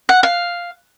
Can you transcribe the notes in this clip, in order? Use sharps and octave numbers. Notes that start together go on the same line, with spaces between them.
F#5
F5